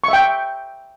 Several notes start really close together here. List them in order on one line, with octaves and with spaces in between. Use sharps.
C#6 E5 G5